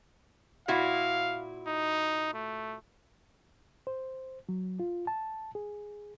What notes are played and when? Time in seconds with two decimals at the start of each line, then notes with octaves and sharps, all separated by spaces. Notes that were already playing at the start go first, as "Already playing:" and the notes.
0.68 A#2 E4 F#4 F5
1.67 D#4
2.34 A3
3.87 C5
4.49 F#3
4.80 F4
5.07 A5
5.55 G#4